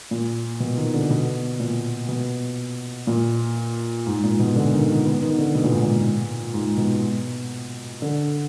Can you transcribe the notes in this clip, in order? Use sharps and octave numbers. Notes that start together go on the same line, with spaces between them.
A#2
B2
D#3
D3
B2
A#2
B2
A#2
G#2
A#2
B2
D3
D#3
D#3
B3
D#3
D3
B2
A#2
G#2
A#2
G#2
B2
D3